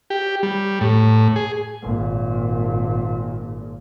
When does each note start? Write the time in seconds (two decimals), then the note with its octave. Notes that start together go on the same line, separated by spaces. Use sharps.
0.10 G4
0.43 G3
0.81 A2
1.36 G#4
1.83 G#1 A#2